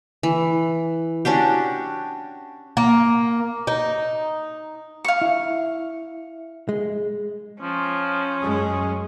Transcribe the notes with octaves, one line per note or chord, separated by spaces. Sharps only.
E3
C#4 D4 F#4 G4
A#3
D#4
F5 C#6
E4
G#3
F3 C#4
F#2 G#3 G#4